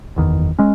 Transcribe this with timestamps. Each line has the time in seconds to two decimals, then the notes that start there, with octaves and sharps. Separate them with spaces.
0.16 F#1 E2 D#3
0.59 G#3 C#4